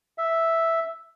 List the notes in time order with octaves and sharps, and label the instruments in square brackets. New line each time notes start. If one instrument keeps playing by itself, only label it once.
[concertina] E5